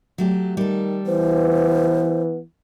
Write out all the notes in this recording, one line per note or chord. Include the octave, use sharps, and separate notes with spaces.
F#3 A3 G4
D#3 G3 A4
E3 B3 C5